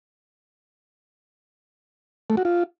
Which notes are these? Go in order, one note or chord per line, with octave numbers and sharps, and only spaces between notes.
A3
F#4
F4